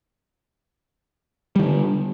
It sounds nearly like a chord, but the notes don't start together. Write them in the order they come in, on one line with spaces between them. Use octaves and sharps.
G3 D#3 D3